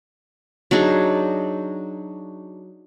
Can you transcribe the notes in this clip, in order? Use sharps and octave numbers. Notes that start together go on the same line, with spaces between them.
F#3 D4 D#4 G#4